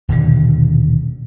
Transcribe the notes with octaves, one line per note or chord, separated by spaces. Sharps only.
D#1 B2 D3